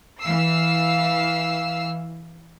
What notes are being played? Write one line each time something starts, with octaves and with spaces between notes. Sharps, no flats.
E3 F5 E6 C7